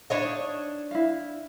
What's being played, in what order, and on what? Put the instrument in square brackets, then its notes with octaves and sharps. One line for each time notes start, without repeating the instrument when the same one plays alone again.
[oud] D4 C#5 D#5
[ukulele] D#4
E4 F5